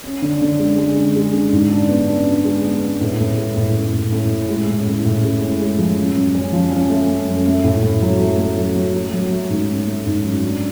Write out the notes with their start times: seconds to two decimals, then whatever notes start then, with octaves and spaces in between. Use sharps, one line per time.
0.04 C#4
0.22 D3
0.42 D3
0.59 G#3
0.78 G#3
0.97 D3
1.16 G#3
1.33 D3
1.53 G#2
1.71 D4
1.89 B3
2.08 D4
2.27 D4
2.45 G#3
2.64 B3
2.83 B3
3.01 A2
3.20 A2
3.38 G#3
3.57 A2
3.74 A2
3.93 A2
4.12 A2
4.31 C#4
4.49 G#3
4.68 A2
4.87 A2
5.05 A2
5.24 G#3
5.42 C#4
5.61 G#3
5.79 F3
5.98 C#4
6.16 F#2
6.35 C#4
6.53 F3
6.72 C#4
6.90 A3
7.09 A3
7.27 F#2
7.47 A3
7.64 A2
7.83 A2
8.02 F#3
8.20 A3
8.39 A3
8.58 F#3
8.75 F#3
8.94 A3
9.14 F#3
9.32 A3
9.50 G#2
9.69 C#4
9.87 A3
10.06 G#2
10.25 F#3
10.43 D4